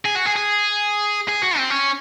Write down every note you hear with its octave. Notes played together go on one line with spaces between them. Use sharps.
G#4
F#4
G#4
G#4
G#4
F#4
C4
C#4